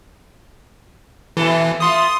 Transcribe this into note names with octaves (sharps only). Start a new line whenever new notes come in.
A#2 E3 E4 A4
A3 F4 C6 D#6